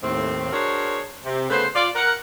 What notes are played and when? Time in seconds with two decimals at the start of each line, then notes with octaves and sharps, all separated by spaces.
0.03 D#2 A2 C4
0.52 D4 F#4 G#4 A#4 C5 C#5
1.25 C3
1.50 C#3 A3 B3 B4 C5
1.75 F4 D5
1.96 A#4 F#5